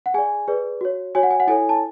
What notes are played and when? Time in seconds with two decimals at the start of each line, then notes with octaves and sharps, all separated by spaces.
0.06 F#5
0.14 G#4 D5 G#5
0.48 G#4 B4 D5
0.81 F#4 C#5
1.15 F#4 C#5 G#5
1.23 F#5
1.31 G#5
1.40 F#5
1.47 E4 A4 C#5 G#5
1.69 A5